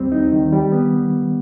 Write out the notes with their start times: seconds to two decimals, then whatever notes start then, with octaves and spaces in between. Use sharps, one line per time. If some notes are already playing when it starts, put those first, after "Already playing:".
Already playing: D#2 G3 C4
0.12 D#4
0.32 D#3
0.52 G3
0.72 B3